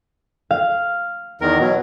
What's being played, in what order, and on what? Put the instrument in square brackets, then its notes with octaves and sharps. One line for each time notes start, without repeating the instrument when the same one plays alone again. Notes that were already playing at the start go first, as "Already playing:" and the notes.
[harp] F5
[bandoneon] E2 D#3 A#4
B2 F#3